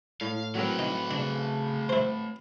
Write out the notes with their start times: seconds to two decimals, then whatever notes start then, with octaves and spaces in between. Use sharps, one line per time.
0.21 A2 F5
0.55 F#3 A3 C4 A#4 B4
0.79 D#4
1.11 C#3 D4
1.89 E4 C5